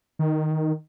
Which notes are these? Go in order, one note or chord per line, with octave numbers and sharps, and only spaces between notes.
D#3